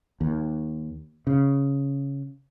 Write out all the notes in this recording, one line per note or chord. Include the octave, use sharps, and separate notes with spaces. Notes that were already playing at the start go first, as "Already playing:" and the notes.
D#2
C#3